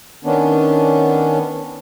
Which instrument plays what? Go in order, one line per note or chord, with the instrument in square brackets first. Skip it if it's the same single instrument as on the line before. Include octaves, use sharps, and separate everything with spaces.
[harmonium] D#3 B3 C#4 D4